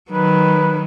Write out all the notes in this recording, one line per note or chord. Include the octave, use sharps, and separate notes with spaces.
D#3 F#3 B4